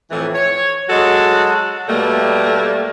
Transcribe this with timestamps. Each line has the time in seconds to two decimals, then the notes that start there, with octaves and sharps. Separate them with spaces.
0.11 F2 A2 E3
0.34 C#5
0.89 F#3 G#3 F#4 A4
1.89 B2 G3 A3 A#3